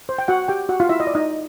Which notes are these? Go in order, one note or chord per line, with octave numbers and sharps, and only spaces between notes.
C5
G5
F#4 F#5
G4 G5
F#4 F#5
F4 F5
E4 E5
D#5
D5
D#4 D#5